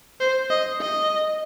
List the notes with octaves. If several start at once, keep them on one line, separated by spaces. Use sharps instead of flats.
C5
D#5
D#5